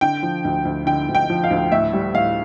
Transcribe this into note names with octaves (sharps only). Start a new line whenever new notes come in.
D3 G5
F3
D2
D2
D3 G5
D2
G5
F3
F5
D2
A2 E5
G3
A2 F5